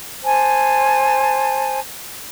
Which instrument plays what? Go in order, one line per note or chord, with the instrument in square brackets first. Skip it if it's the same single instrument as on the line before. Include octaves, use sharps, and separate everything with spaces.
[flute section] C5 G#5 A5